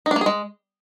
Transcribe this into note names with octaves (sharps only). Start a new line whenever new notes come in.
D#4
D4
A#3
G#4
G#3